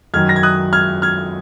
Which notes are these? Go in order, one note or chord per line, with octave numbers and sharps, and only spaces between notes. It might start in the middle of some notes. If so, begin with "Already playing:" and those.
F#2 D#3 F#3 F6 G#6
A#6
G#6
D#6 F#6
F6 G#6
F6 G#6